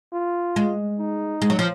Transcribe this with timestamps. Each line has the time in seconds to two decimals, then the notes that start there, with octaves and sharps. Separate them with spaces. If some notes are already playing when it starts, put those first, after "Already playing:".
0.13 F4
0.56 G#3
0.99 D#4
1.42 G#3
1.50 F#3
1.59 F3